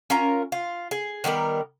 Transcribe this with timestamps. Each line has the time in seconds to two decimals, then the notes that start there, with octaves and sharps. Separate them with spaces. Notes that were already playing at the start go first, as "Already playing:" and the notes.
0.10 C#4 F4 A#4 A#5
0.52 F4
0.91 G#4
1.24 D#3 G3 B3 A#4